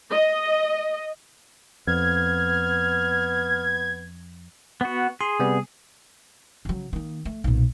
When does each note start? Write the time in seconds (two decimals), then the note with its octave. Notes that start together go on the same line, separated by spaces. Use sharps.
0.12 D#5
1.87 F2 B3 F6 G#6
4.81 B3 F#4
5.21 G#4 C6
5.40 C3 G3 B3
6.65 C#3 F#3
6.93 D#3 A#3
7.25 A3
7.44 B1 A#2